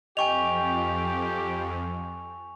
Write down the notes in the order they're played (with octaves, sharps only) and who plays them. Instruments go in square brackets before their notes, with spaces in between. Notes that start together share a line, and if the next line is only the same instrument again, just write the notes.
[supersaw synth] F2 [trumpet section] G4 [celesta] D#5 G5 [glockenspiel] G#5 C#6 F7